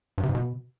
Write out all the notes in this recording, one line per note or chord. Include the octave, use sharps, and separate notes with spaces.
G2
C3
G#2
B2